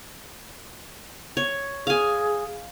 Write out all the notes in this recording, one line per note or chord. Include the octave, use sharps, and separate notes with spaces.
C#5
G#4 F5 G#5